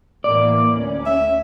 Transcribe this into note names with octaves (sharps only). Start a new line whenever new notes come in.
A2 E3 A#3 D5
D2 C#4
E5